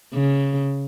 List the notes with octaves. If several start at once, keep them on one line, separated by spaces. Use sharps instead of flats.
C#3